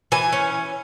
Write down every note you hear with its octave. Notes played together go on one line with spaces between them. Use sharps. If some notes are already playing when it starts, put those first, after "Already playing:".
E3 G#5
C#4